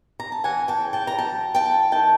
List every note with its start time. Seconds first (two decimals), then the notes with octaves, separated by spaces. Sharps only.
0.20 A#5
0.32 A5
0.44 E3 F#5 G#5
0.68 G5 A5
0.81 C#3
0.93 G5 A5
1.07 A#5
1.18 F#3 G5 A5
1.55 E4 G5 A5
1.92 D#3 G5 A5